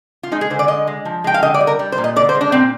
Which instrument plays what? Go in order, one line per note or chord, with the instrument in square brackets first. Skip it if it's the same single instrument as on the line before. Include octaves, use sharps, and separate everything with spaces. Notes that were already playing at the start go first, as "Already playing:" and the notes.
[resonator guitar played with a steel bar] F4
G#3 D#4
G#4
D3 C5
D5
G#3 D#5
G#3
F3
G#3 G5
F5
D3 D#5
D5
G3
A#4
G3
C5
A#2
D#5
D3 D5
C5
G#3
D4
A#2 C4